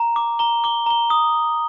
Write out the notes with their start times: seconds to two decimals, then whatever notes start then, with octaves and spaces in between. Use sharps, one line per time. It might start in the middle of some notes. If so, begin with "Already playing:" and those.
Already playing: A#5
0.16 D6
0.39 A#5 G7
0.64 D6 G7
0.86 A#5 G7
1.10 D#6